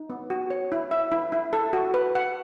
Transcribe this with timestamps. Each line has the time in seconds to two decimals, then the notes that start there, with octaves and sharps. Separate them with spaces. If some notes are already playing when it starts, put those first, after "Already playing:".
Already playing: D#4
0.10 B3
0.30 F#4
0.50 C#5
0.72 E4
0.91 E5
1.12 E4
1.32 E4
1.53 A4
1.73 F#4
1.94 B4
2.15 F#5